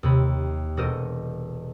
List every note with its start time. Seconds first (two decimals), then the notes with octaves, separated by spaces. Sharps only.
0.03 D#2 C3 B5
0.77 E1 F#4 A4 A#4 C5 D#5